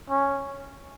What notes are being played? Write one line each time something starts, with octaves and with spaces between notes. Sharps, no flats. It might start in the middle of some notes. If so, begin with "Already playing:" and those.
C#4